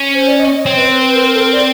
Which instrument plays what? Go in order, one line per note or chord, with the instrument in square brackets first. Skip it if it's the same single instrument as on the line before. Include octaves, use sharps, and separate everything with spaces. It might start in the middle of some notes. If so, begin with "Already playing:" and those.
Already playing: [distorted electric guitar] C#4
[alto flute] C5
D5
D#5
D#5
[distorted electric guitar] C4 [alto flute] C#5
[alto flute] B4
B4
B4
A#4
B4
A#4
A4
A#4
D5